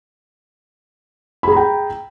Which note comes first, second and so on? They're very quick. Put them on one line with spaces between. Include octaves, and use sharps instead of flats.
B5 G#4 A#5 G5